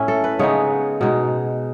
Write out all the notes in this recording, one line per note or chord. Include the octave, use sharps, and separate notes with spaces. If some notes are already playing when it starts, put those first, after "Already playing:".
Already playing: A2 C#4 E4
A4
B4
C#3 G#3 B3 D#4 C#5
B2 G#3 D#4